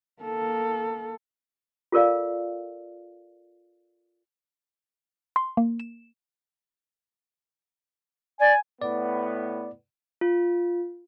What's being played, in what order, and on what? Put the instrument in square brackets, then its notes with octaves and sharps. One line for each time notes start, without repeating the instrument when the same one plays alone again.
[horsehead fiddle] A#3 A4
[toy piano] F4 A4 A#4 D5 F5
[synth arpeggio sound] C6
A#3
E7
[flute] D5 [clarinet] G#5
[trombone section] A2 B3 [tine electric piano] D5
[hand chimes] F4